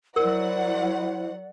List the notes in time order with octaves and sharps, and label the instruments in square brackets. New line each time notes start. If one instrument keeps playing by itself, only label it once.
[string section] F#3 F#5 [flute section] E4 C5 [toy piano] A#4 E6 [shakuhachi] D5